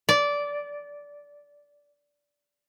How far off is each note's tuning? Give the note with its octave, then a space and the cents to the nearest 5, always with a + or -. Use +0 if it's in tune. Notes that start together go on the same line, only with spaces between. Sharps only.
D5 -15